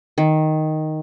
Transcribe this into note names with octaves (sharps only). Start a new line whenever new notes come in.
D#3